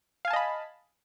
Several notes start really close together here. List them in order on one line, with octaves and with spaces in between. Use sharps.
F5 G#5 A5 D#5 B5